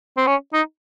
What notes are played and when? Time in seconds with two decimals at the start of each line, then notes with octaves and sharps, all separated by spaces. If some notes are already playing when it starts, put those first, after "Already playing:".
0.17 C4
0.27 C#4
0.53 D#4